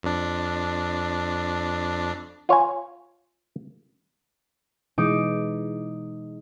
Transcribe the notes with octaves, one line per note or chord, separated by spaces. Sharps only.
F2 D4
F4 C#5 F5 G#5
B2 E3 G#3 D#4 D6